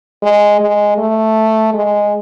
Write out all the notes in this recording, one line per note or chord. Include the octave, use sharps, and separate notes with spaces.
G#3
G#3
A3
G#3